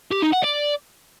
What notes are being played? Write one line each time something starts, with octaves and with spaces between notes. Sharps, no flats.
G4
D#4
F#5
D5